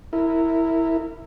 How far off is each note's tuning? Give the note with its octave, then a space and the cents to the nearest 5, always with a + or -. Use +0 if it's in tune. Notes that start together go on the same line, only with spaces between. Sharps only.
E4 -5 A#4 -25